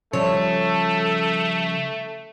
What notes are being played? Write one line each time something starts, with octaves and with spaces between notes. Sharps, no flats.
C#3 F3 G3 A3 A4 C#5